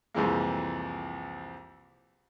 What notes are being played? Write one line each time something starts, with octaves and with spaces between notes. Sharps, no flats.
C2 F2 E3 G#3 A#3